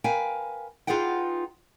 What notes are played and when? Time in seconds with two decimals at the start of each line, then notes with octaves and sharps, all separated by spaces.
0.04 A#4 B4 F5 G5 G#5
0.87 D#4 F4 G#4 B4 F#5 G5